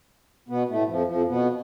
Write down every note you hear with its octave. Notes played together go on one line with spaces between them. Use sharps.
B2 B3
A2 A3
F2 F3
F2 F3
B2 B3